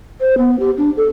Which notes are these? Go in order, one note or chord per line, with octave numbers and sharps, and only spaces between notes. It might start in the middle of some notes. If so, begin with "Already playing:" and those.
C5
B3
G4
D4
A4